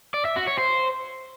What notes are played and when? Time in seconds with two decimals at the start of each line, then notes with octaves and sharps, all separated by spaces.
0.14 D5
0.25 E5
0.36 F#4
0.47 C#5
0.58 C5